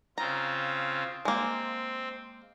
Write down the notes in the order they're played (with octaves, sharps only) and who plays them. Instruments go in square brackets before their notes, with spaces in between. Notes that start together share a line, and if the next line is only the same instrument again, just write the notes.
[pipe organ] C#3 C4 F4 [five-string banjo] A#5
[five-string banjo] G#3 A#3 [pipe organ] C4